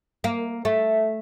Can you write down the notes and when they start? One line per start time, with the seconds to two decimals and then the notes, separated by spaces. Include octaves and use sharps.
0.24 A#3
0.65 A3